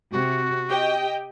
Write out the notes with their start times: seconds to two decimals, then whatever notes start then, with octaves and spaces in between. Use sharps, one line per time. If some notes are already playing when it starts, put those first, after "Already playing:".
0.12 C3 F#4
0.69 G4 D#5 G5